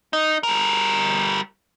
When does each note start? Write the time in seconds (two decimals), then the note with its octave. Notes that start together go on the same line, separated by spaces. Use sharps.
0.13 D#4
0.43 G3 A#4